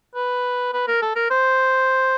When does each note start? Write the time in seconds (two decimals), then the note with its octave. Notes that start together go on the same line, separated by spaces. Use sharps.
0.15 B4
0.73 B4
0.87 A#4
1.02 A4
1.16 A#4
1.31 C5